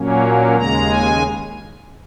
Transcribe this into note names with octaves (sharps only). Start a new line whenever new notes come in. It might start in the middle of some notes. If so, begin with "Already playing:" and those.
Already playing: A#2 F#3 A#3 C#4
D#2 C#3 G#3 A#5
G#5